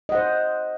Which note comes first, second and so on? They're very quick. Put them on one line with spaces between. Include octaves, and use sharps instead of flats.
D#5 F#5 C5